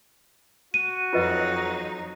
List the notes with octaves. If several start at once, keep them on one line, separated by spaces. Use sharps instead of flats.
F#4 D#7
F2 F#3 D#4 F4 B4 D#5